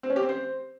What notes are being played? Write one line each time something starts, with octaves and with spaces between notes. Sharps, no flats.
C4
C#4
G4
C4
C5